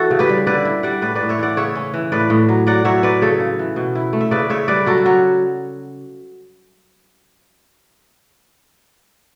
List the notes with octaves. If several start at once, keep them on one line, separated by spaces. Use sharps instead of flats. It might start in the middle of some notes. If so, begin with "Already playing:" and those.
Already playing: E3 F#4 A4
C#3
G4 B4
G3
D3 B4 D5
E4
G3 D5 F#5
A2 B4 D5
B4 D5
A2
C#5 E5
E3 D5 F#5
C#3 C#5 E5
C#4
E3
A2 B4 D5
A2
F#3
F#3 D5 F#5
F#3 C#5 E5
C#4 B4 D5
C#3 A4 C#5
C#3
E3
B2
E4
A3
E5
C#3 B4 D5
C#3 C#5 E5
G3 B4 D5
F#3 F#4 A4
F#3